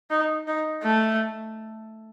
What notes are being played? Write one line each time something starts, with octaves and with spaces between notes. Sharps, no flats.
D#4
D#4
A3